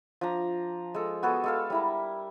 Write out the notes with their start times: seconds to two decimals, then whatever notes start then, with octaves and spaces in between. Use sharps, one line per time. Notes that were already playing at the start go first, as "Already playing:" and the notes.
0.21 F3 D4 A#5
0.94 G#3 A4
1.23 B3 F#4 G#4 A4
1.44 G#3 A4 F5
1.70 G3 E4 A#4